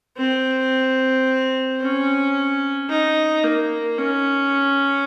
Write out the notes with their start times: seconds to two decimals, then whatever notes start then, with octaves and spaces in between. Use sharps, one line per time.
0.17 C4
1.81 C#4
2.90 D#4
3.44 A#3
3.98 C#4